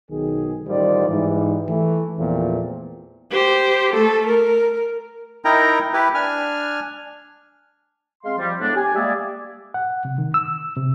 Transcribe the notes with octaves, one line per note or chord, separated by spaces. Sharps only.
B1 D#3 G#4
A1 D#3 G3 F4 C5 D5
G#2 E3 G3
E3 A3
E2 A#2 F3 A3 B3 C4
G4 C5
A3 A4
A#4
D#4 E4 A#4 G5 A#5
E4 G4 B4
D4 G#5 F6
G#3 C4 F5 C6
F3 G3
A2 G#3 B3 D4
G4 G#5
G3 G#3 A#3 G#4 D5 E5
F#5
C3
D#3
E6
C3